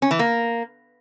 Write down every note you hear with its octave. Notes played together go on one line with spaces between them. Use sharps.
C#4
E3
A#3